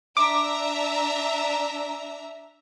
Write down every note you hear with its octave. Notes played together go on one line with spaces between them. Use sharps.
D4 E5 A#5 D6